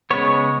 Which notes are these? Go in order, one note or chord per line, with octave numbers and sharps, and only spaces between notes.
C#3 G#3 B3 C#5